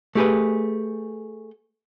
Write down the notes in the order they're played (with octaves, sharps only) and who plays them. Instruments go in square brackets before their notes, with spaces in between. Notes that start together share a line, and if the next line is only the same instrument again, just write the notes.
[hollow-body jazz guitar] A3 G4 G#4 B4